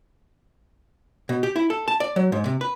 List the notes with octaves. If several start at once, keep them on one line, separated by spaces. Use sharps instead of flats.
B2
G4
E4
A4
A5
D5
F#3
G#2
C3
B4